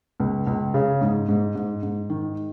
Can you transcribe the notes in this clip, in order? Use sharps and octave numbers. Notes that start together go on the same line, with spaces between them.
C#2
C#2
C#3
G#2
G#2
G#2
G#2
D#3